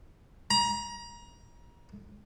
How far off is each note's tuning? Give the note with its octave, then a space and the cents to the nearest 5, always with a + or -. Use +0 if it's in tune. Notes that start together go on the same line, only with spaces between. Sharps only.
A#5 +30